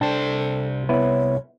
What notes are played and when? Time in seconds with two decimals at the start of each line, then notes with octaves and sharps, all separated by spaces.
0.01 C2 D4 A4 C5 G5 A5
0.89 B3 E4 B4 C#5